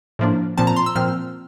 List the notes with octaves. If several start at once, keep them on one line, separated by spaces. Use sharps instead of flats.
A2 F3 A#3 D4
A#2 F3 C4 A5
A#5
C6
E6
A#2 F3 C4 F6